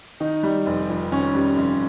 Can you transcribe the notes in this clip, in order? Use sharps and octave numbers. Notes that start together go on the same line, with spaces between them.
D#3 D#4
G3
F1
F2
D#3 C#4
G3
F1